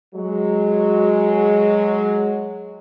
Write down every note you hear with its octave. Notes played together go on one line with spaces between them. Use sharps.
F#3 G#3